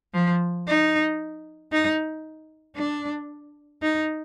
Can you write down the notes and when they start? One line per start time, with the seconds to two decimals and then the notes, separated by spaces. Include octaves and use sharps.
0.14 F3
0.67 D#4
1.72 D#4
2.76 D4
3.82 D#4